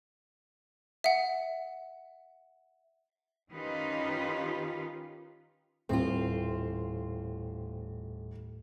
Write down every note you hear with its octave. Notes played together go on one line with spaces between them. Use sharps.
E5 F#5
D#3 C#4 D#4 F4 G4 B4
D#1 A2 C4 F4